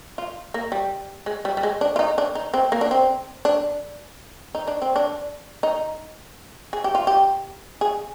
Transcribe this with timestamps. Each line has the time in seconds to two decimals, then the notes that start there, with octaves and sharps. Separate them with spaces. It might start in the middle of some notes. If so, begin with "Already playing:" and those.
0.18 F4
0.54 A#3
0.72 G3
1.26 G#3
1.45 G3
1.57 G3
1.63 G#3
1.81 D4
1.96 F4
1.99 D#4
2.18 D4
2.35 D#4
2.54 C4
2.72 A#3
2.81 D4
2.91 C4
3.45 D4
4.55 D#4
4.67 D4
4.82 C4
4.96 D4
5.63 D#4
6.73 G#4
6.84 G4
6.95 F4
7.07 G4
7.81 G#4